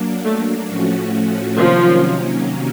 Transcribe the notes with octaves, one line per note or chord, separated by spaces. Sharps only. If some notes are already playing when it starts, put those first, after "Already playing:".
Already playing: F#3 A#3 D4
A3
A2 F3 A3 C#4 F#4
C3 D#3 F3 F#3 A#3 C#4